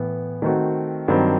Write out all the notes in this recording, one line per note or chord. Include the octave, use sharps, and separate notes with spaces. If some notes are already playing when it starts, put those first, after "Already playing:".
Already playing: A2 E3 B3
D#3 A3 C4 F#4
G2 D#3 F#3 C4